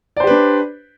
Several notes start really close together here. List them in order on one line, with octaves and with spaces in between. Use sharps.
D5 C5 G4 B4 D4